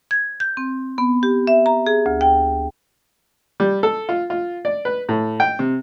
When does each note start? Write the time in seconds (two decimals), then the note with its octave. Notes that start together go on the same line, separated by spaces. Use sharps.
0.11 G#6
0.40 G6
0.57 C4
0.98 B3
1.23 G4
1.47 E5
1.66 A#5
1.86 G#4
2.06 D2
2.21 G5
3.60 G3
3.83 A4
4.09 F4
4.30 F4
4.65 D5
4.85 B4
5.09 A2
5.40 G5
5.59 C3